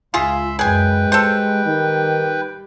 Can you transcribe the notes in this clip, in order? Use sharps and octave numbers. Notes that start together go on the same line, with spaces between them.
C#2 F4 G#4 E5 B5 C6
F#2 G#3 G#4 B4 G5 G#5
G3 A4 C5
D#3